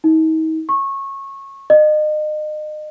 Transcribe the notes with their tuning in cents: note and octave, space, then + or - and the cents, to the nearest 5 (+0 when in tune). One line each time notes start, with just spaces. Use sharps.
D#4 +40
C#6 -20
D#5 -35